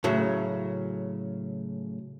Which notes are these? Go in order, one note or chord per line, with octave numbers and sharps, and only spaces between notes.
A2 C#3 F#3